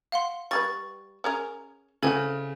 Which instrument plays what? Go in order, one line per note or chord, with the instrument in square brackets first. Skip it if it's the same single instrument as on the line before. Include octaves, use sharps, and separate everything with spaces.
[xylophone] F5 F#5 C6
[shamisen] G3 G#4 B4 [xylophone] C#6 A6
[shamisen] C#4 G#4 A#4
[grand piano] C#3 [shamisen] E3 C4 F#4 [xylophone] A4 G#5 G#6